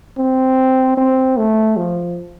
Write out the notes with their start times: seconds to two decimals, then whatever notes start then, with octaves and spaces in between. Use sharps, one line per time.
0.18 C4
0.97 C4
1.37 A3
1.77 F3